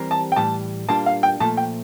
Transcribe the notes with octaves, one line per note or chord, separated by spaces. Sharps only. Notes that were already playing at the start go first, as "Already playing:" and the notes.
Already playing: E3 G3 C4 G4 A#4
A5
G5
A2 E3 G3 A5
A#2 G3 A#3 D4 F4 A5
F5
G5
A#2 F3 A3 A5
G5